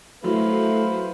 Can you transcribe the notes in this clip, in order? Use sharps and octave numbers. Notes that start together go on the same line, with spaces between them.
F#3 A3 E4 B4 C5 F5